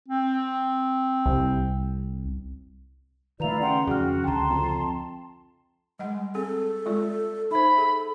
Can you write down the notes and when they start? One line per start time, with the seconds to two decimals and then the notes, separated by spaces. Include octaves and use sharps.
0.09 C4
1.26 C2
3.40 D#3 A3 E4 F4 B4 D5 A#5 F7
3.61 C#3 F#5 G5 C6
3.87 F2 D#3 F#4 G#4 F6
4.24 C#2 D3 G5 A5 A#5 C6
4.50 F2
5.99 G3 G#3 D#5 F#5
6.35 C4 G#4 A4
6.86 G#3 F4 D5
7.51 D#4 C5 E5 B5
7.78 G#4 A4